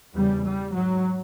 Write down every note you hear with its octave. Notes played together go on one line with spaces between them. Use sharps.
E2 C#3 G3
G3
G#2 F#3